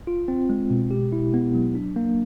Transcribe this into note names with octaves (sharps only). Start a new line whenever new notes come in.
F4
C4
G#3
B2
G4
E4
B3
F#3
D4
A#3